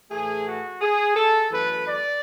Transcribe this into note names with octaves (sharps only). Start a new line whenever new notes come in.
A2 E3 A3 G#4
F#4
G#4
A4
F#2 E3 A3 B4
D5